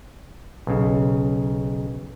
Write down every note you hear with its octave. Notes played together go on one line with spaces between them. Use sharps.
B1 C#3